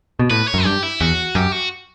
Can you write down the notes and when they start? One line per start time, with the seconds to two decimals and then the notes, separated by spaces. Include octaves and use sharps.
0.19 B2
0.31 A2 B4
0.48 C#5
0.54 F#2
0.65 G2 G4
0.83 E4
1.00 E2 F#4
1.35 F#2 G4
1.52 F#4